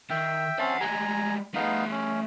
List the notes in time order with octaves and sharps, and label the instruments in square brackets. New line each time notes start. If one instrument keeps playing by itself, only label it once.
[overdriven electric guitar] D#3 [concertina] E5 G5
[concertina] C4 C#4 A5 [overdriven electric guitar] E5 F#5
[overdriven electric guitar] G3 G#3 [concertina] G#5 A#5
[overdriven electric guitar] A3 G#4 [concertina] B3 D#4 F5
[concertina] C#4